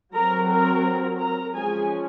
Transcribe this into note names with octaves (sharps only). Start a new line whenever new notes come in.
F#3 C4 A#4 A#5
A#4 A#5
A#4 A#5
F3 G#3 C#4 G#4 G#5